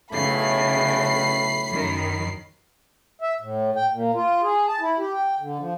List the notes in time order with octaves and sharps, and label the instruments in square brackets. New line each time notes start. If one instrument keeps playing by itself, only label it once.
[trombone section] B1 A2 A3 [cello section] C#3 [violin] B5 C7
[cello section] F#2 D#3
[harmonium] E5
A2
G5
A#2
F4
G#4
A5
E4
G4
G5
D3
F3